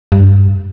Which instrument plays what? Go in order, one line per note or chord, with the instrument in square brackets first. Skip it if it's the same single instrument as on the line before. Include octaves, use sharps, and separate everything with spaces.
[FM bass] G2